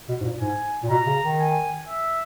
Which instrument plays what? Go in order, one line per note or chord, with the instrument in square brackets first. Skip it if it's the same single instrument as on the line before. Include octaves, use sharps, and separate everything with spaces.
[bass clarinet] B2
G#2
A#2
[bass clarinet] G#2 [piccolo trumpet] G#5
[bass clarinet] A#2
[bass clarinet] B2 [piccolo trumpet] A#5
[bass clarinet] C#3
D#3
[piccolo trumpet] G#5
E5